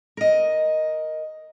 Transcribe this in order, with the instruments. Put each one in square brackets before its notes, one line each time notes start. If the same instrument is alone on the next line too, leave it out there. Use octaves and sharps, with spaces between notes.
[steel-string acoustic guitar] A#4 D#5